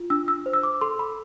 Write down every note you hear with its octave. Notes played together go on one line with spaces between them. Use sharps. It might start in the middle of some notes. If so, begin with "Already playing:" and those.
Already playing: F4
D4 E6
E6
C5
E6
D6
A4 C6
B5